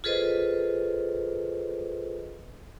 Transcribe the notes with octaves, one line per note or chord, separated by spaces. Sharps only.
F4 G#4 A4 B4 C5 D#5